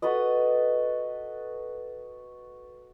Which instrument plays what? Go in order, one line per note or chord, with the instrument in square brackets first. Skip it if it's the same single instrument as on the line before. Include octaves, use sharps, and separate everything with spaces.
[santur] F#4 A4 B4 D#5